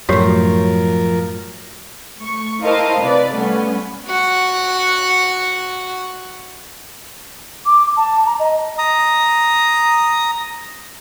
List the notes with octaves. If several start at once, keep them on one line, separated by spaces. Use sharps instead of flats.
F#2 A2 F3 F#4 G4 A#4 C#5
A3 C#6
E4 A#4 C5 D#5 F5 A5
C3 B4 D5
G3 A3 B3 C#4
F#4 F#5
D6
A5
A#5
D#5
A#5 D#6